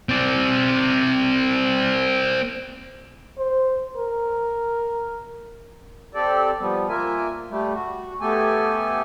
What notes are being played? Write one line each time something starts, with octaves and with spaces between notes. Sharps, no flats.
C4 D5
C5
A#4
C4 G4 A4 D5
F3 G3 B3
A#3 F4 A#4 E5 G#5
G3 A3
F#4
A3 B3 G4 A4 G#5